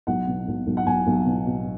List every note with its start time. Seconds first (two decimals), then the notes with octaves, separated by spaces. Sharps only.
0.07 B1 F#5
0.27 B2
0.48 B1
0.67 B1
0.77 F#5
0.87 B1 G#5
1.07 B1
1.26 B2
1.46 B2